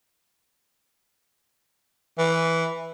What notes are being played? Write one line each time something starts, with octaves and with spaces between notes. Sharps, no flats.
E3